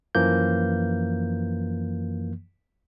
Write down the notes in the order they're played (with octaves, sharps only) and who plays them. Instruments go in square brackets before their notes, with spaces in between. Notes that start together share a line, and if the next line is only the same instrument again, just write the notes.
[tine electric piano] F#2 E3 F3 A#3 G6